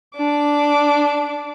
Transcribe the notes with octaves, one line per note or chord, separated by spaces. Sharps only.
D4 D6